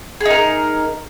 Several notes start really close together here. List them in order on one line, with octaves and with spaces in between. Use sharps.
G#4 D#4 A#4